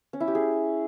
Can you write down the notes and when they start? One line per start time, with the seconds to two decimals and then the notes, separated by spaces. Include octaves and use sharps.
0.13 C#4
0.20 E4
0.28 G4
0.35 G#4